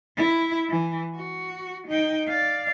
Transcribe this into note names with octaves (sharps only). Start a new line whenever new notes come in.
E4
E3
F#4
D#4 G5
D5 F5